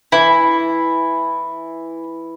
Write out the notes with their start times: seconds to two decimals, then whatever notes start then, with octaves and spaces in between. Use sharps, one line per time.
0.12 E3 E4